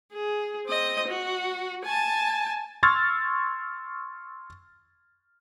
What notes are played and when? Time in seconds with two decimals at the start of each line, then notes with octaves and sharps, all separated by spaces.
0.13 G#4
0.67 C4 D#5
1.08 F#4
1.85 G#5 A5
2.83 C6 C#6 E6 F6 G#6 A6